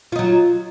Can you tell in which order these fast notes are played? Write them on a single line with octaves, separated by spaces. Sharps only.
F4 D#4 F#3